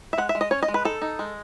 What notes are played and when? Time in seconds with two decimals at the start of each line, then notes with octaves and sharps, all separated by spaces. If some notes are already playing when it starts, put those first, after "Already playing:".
0.13 E5
0.18 G#3 F#5
0.29 E5
0.35 G#3
0.41 D#5
0.51 C#4 C#5
0.63 D#5
0.68 G#3
0.74 B4
0.85 D#4 A4
1.02 D#4
1.19 G#3